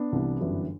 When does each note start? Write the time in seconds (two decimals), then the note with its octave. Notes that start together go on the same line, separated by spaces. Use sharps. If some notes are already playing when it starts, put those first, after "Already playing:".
Already playing: B3 D4
0.12 C2 C3 E3
0.41 G1 F#2 E3